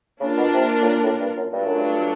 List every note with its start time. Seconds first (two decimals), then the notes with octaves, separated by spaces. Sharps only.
0.20 C#3 A#3 D4 F4 A#4
0.37 B2
0.53 C3
0.82 A2
0.87 A#2
1.03 A2
1.20 G2
1.37 F#2
1.53 G2 F#3 A3 D4 F4
1.65 F#2
1.77 G2